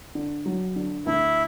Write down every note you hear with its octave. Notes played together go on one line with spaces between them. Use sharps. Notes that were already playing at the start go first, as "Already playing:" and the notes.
D3
F#3
D3
D2 E4